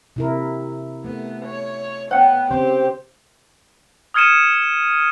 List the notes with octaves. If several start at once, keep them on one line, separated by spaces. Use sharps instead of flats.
C3 E4 A#4
A3 B3
C#5
B3 C#5 F#5 G5
C#3 C4 G4 C5
D#6 F6 G#6 C#7 D#7 E7